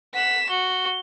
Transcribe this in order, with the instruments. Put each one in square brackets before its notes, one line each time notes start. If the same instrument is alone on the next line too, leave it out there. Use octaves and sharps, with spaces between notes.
[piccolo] F#5 [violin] B6 E7
[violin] F#4 [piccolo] G7